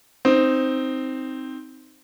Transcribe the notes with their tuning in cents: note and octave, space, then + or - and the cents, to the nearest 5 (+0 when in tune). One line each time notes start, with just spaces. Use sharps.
C4 +0 D#4 +0